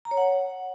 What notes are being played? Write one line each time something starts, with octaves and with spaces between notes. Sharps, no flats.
A#5
C#5
F#5